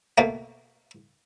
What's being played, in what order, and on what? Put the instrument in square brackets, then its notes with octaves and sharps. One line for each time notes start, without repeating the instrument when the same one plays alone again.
[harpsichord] B2 A3 A#3